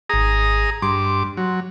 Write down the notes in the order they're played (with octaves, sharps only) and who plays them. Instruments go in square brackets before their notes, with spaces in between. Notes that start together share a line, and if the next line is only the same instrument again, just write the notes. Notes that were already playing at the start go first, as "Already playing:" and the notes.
[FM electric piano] G#1 A#6 [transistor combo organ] G#4 A#5 D#6
[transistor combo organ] G2 D6 [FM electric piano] C6
[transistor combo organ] F#3